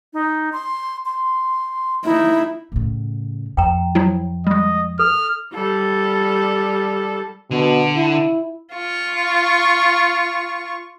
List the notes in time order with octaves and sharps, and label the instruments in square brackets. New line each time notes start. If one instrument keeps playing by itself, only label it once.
[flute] D#4
C6
C6
[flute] D#4 [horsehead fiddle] E4
[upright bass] A2 C#3
[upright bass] F2 [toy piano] G5 A#5
[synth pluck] F3 F#3 E4
[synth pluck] G3 G#3 [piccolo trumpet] D#5
[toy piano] A4 [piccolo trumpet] F6
[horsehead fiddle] G3 A4
[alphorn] B2 [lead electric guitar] D3
[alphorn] E4
[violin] F4 C#6